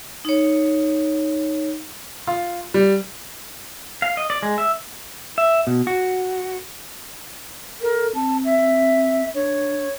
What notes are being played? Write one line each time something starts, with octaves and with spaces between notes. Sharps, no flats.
D#4 C#5
F4
G3
F5
D#5
D5
G#3
E5
E5
B2
F#4
A4 A#4
C4 A5
E5
D4 C#5